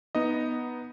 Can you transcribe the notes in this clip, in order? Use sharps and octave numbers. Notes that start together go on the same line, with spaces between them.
B3 D#4 D#5